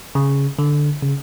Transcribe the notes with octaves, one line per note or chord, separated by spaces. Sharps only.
C#3
D3
C#3